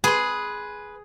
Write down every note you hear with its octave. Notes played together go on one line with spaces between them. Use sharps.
G#4 B4 C6